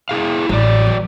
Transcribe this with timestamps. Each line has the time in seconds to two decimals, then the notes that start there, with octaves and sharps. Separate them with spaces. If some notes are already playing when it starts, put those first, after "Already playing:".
0.09 E4 G#4 F5
0.49 A1 F#3 D5
0.87 E3 B3